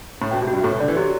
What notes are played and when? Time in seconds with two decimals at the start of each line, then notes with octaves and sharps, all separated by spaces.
0.22 A2
0.31 B2 G5
0.42 C3
0.47 F#4
0.53 G2
0.63 A2 A4
0.72 B2
0.80 D3 D5
0.88 E3
0.96 F#3 G4